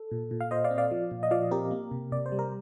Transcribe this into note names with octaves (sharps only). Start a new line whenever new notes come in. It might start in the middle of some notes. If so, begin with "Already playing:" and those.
Already playing: A4
A#2
A#2
F5
A#2 C5 D#5
D5 F5
C4
D5 F5
F3
A#2
D#5
F3 D5 F5
C4 G4 A#4
A#3
C3
C3 D5
C5
G3
A#4